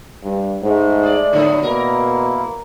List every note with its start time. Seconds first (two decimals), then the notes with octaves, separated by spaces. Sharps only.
0.23 G2
0.63 G#2 G#3 A3
1.03 G#4 D5
1.33 A2 D3 F#3 B3
1.63 B2 A#3 E4 A#4